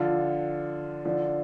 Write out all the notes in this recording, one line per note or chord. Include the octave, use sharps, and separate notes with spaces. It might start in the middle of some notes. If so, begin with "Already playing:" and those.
Already playing: D3 F3 D4 F4
D3 F3 D4